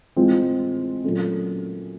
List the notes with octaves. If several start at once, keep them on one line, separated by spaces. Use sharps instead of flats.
A2 E3 G#3 C4 F4
A#2 F#3 A3 C#4